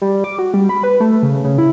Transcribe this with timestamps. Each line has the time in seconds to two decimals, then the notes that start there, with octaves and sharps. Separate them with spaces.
0.02 G3
0.24 D6
0.39 F#4
0.54 G3
0.69 B5
0.83 B4
1.00 A3
1.23 C#3
1.44 C#3
1.58 E4